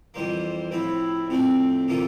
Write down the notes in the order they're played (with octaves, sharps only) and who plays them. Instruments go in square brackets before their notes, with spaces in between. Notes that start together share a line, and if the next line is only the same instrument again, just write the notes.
[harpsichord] F2 E3 G3 A#3 [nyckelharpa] C5
[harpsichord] A2 F3 C4 [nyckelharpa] E4
[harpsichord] A2 F3 A3 D4 [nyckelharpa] C4
[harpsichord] C3 E3 A#3 F4 A4